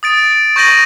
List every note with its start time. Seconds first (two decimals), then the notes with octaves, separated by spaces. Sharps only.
0.03 D#6 A6 D7
0.56 C#6 G6 A#6 D#7 F#7